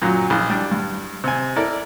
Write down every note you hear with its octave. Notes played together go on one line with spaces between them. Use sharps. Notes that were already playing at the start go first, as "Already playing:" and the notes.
F#2 A#2 F#3
A#1 E3
G3 D4
G2
C3 G#5
E4 A4 A#4 D5